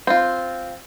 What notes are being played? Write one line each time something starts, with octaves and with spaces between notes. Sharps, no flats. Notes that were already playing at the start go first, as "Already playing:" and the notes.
C4 F4